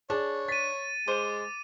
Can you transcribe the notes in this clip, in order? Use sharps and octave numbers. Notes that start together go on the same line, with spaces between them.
D4 G#4 C#5
A6 B6 D#7
G#3 C5 D6 D#7